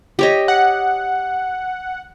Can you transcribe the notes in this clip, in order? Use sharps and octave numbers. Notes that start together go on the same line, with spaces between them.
G4 C#5 D#5
F#5